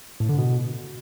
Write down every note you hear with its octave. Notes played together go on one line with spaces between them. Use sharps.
A2
D3
B2